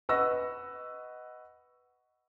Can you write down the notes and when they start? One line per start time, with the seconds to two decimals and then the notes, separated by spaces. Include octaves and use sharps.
0.09 B4 D#5 F#5 C#6 E6 A#6